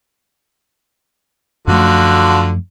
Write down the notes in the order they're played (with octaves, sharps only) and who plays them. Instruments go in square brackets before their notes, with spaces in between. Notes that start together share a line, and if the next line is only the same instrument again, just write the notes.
[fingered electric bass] F#2 F3 A3 [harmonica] D3 F4 F#4